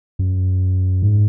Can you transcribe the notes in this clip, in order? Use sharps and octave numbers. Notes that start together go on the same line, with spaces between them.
F#2
G#2